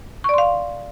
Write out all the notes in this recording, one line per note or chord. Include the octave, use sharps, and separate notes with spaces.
D5 F5 C6 C#6